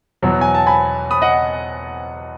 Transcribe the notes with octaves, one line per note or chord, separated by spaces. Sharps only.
E2 B2 F#3
G#5
A5
G#5 B5
B5 D#6
D#5 F#5